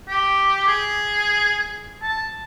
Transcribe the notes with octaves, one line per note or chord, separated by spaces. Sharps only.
G4
G#4
A5